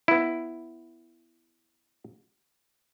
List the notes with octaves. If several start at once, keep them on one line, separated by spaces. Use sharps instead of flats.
B3 E4